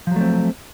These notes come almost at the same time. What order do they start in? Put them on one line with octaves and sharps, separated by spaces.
F3 F#3 A3 C4